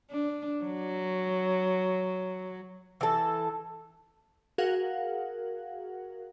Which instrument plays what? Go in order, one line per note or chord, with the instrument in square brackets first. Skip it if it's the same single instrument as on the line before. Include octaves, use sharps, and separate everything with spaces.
[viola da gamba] D4
F#3
[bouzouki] E3 A4
[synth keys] F#4 G#4 A#4 F5 F#5